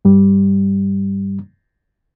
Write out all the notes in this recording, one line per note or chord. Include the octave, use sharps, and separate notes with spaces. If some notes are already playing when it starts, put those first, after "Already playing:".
G2 G3